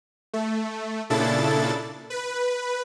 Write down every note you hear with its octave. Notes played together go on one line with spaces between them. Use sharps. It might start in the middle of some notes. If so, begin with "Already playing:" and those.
A3
A#2 C#3 D4 E4 A4 A6
B4